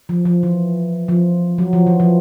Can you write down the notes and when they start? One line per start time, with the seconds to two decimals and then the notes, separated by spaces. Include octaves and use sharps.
0.09 F3
0.25 F3
0.43 E3
1.08 F3
1.58 F#3
1.73 F3
1.87 E3
2.00 F3